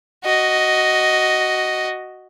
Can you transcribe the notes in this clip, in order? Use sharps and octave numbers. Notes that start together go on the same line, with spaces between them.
F#4 D#5